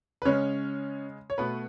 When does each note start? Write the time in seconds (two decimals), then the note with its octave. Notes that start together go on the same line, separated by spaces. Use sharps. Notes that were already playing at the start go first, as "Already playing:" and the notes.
0.22 B4
0.25 C#3 G#3 C#4 C#5
1.30 C#5
1.38 B2 A3 B3 B4